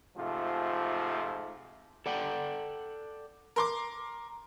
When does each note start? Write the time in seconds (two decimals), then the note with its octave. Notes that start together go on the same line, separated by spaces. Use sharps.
0.16 G#2 C3 F3 A3 F4
2.06 A4 D5 F#5 G5
3.56 A#4 C6 D6